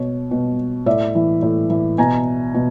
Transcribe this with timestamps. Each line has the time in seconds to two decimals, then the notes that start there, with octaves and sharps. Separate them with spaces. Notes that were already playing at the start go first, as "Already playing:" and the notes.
Already playing: B2 C#5
0.31 B2
0.86 A2 D5 E5
1.15 E3
1.42 A2
1.70 E3
1.98 B2 G#5 A#5
2.55 B2